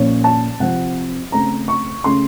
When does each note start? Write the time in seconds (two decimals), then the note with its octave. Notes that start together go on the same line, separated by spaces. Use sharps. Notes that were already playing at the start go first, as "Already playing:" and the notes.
Already playing: A#2 F3 A#3 C#4 C#5
0.24 A5
0.60 C3 F3 C4 F#5
1.32 C#3 A3 C4 A#5
1.68 C#6
2.04 C#3 A3 C#4 C6